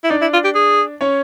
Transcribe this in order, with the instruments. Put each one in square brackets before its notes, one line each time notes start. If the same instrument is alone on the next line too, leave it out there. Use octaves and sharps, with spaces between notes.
[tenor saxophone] E4
[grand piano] D4 D5 [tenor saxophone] D#4
[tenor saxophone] E4
F4
G4
G#4
[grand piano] C#4 C#5